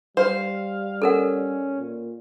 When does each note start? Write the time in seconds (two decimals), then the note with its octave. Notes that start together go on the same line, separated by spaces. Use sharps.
0.17 G3 C5 F5
1.02 C#4 A4 A#4 F#5
1.79 A#2